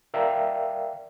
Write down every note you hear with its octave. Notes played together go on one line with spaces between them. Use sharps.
A#4 D5 E5 F5 G5